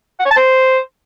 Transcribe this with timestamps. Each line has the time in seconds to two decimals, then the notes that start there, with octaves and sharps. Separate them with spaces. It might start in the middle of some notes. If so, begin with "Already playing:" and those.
0.20 F#5
0.26 C#5
0.31 A5
0.37 C5